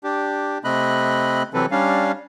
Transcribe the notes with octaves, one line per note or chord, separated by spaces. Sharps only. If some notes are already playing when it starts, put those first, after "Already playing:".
D4 G4
C3 A3 C4 D#5 B5 F#6
C3 E3 F#3 C4 A4 B4
G3 C#4 D4 F5